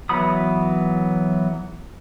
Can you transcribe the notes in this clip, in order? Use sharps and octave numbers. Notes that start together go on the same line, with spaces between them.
E3 F#3 B3 B5 D#6